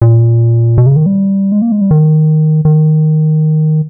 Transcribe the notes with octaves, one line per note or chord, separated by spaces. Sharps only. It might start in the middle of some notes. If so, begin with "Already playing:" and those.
A#2
B2
C#3
D#3
G3
G#3
A#3
G#3
G3
D#3
D#3